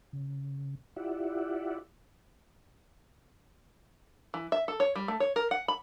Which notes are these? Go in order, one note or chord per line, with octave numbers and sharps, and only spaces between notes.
C#3
E4 F4 G4 D5 E5 F#5
E3
E5
A4
C#5
G3
A3
C#5
A#4
F#5
B5